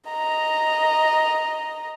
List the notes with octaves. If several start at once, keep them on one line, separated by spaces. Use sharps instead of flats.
D#5 A#5